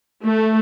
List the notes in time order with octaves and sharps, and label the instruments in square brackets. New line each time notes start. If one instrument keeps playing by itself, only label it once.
[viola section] A3